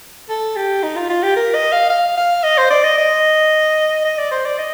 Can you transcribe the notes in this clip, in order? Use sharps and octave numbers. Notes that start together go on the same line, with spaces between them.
A4
G4
D#4
F4
F4
G4
A#4
D#5
F5
F5
F5
D#5
C5
D5
D#5
D#5
D#5
D5
C5
D5
D#5